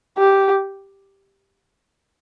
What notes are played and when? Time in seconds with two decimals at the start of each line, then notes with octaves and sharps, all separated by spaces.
0.18 G4